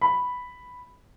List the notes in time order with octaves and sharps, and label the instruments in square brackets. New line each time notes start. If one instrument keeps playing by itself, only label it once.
[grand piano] B5